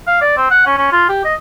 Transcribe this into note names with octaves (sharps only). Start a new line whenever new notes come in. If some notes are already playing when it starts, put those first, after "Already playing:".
F5
D5
C4
F#5
C#4
C#4
F4
G4
D#5